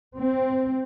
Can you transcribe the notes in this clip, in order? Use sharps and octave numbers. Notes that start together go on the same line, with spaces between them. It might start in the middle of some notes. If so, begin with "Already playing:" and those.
C4